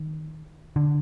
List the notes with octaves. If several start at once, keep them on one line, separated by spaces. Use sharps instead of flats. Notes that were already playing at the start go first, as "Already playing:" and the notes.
Already playing: D#3
D3